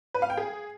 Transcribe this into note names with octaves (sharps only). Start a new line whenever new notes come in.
B4
F5
G5
G#4